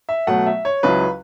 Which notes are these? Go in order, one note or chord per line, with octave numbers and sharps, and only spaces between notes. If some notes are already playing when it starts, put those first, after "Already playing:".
E5
B2 F#3 A3 F#5
E5
C#5
C#2 C#3 F#3 C#4 E4 B4